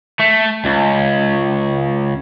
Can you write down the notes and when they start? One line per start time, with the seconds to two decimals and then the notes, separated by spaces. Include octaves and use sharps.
0.19 A3
0.65 C#2